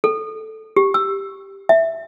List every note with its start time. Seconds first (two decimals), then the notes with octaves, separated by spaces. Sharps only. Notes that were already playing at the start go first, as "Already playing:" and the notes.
0.04 A4
0.76 G4
0.94 E6
1.69 E5